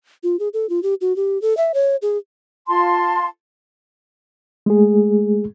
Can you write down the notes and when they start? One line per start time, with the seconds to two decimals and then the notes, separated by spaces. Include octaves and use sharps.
0.23 F4
0.39 G#4
0.54 A4
0.69 F4
0.83 G4
1.01 F#4
1.16 G4
1.42 A4
1.57 E5
1.74 C#5
2.02 G#4
2.68 F4 A5 C6
4.66 G#3 A3 G#4